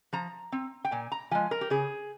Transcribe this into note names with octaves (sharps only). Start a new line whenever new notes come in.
F3 A#5
C4
G5
A#2 G#5
A#5
F3 G#3 G#5
A#4
G4
C#3 G#4